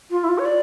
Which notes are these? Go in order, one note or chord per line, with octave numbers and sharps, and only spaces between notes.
F4
E4
F4
C#5
D5